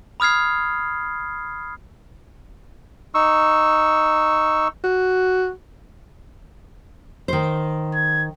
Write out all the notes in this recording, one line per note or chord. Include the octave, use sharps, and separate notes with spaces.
B5 D#6 F6 G#6 C7
D#4 C#6 E6
F#4
D#3 C5
G#6